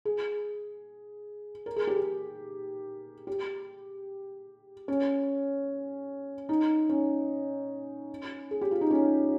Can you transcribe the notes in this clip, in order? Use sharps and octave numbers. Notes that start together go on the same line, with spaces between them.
G#4
A#4
G#4
G4
G#4
G4
C#4
D#4
C#4
G#4
G4
F4
D#4
C#4